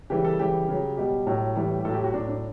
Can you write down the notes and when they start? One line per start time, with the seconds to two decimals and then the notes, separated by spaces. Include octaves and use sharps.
0.10 C#3 E3 G3 G4
0.25 A4
0.39 C#3 E3 G3 G4
0.69 C#3 F#3
0.97 B2 G3 G4
1.26 A2 F#3
1.56 A2 E3 G3
1.79 G4
1.85 A2 F#3 A4
1.94 G4
2.04 F#4
2.13 A2 F#3 D4
2.28 D4